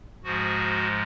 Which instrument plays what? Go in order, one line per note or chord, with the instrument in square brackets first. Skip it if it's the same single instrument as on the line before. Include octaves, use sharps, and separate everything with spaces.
[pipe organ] G#2 F3 G#3 F#4